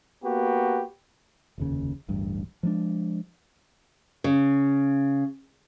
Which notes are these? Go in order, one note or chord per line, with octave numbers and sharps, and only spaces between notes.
A#3 B3 F#4 G4 B4
F1 D#2 C#3
D1 A1 G2
F3 G#3 D4
C#3